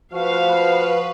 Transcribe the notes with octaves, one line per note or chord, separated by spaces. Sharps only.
F3 F#4 B4 F5